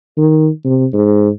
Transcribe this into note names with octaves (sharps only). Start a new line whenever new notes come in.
D#3
C3
G#2